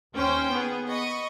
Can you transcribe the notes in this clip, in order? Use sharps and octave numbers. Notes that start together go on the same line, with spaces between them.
D#2 C#4 C5 G5
B3 G#4
D#5 B5 C#6